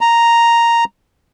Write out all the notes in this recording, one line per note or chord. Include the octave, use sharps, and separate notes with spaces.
A#5